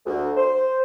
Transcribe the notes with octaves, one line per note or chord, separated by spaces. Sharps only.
D2
C5